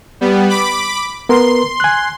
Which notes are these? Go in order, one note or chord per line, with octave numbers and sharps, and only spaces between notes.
G3 B3
B5 D6
B3 A#4 B4 C6
G#5 F#6